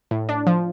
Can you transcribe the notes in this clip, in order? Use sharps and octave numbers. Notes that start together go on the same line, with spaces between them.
A2
D4
F3